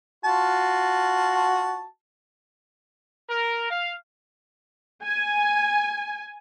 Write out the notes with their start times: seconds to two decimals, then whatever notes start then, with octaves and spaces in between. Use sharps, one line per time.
0.25 F4 F#4 A5
3.28 A#4
3.69 F5
5.04 G#5